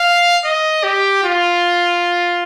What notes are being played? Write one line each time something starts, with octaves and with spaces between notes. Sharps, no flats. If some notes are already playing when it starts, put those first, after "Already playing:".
Already playing: F5
D#5
G4
F4